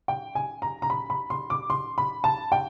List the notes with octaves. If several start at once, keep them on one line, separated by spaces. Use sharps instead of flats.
G5
G#5
A#5
A#5
B5
B5
C6
D6
C6
B5
A5
G5